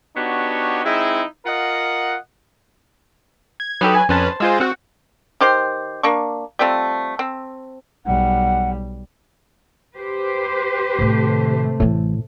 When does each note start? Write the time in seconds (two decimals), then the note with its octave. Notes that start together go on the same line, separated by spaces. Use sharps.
0.16 B3 D4 D#4 F#4 G4 C#5
0.84 G#3 C4 D#4 E4
1.46 F4 A#4 D#5 F#5
3.60 G#6
3.81 F#3 D#4 G4 A4 B4
3.95 G#5
4.09 F2 C#4 B4 C5 A5
4.40 G#3 F4 C5 D#5 G#5 E6
4.60 C4 F#4 F#5 F#6
5.41 D#3 G4 C5 C6
6.03 A#3 D4 C#6
6.59 G3 A3 C4 F4
7.19 C4
8.06 B1 G3 F#5
9.97 G4 B4 C5
10.99 A2 C3 D#3 A3
11.80 A1 A2 E3